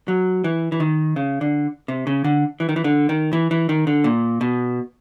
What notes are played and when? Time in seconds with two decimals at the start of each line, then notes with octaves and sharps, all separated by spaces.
0.08 F#3
0.44 E3
0.72 E3
0.80 D#3
1.16 C#3
1.41 D3
1.88 C3
2.07 C#3
2.24 D3
2.60 E3
2.69 D#3
2.76 E3
2.84 D3
3.09 D#3
3.33 E3
3.51 E3
3.69 D#3
3.87 D3
4.04 A#2
4.41 B2